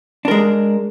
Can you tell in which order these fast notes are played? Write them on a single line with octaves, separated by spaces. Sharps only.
D4 A#4 G#3